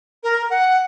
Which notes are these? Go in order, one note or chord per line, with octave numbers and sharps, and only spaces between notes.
A#4
F#5